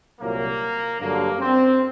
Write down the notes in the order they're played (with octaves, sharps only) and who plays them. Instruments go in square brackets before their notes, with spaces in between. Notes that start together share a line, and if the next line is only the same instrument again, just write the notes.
[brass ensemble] C2 A#2 F#3 A#3
G2 D3 F#3 A#3
C4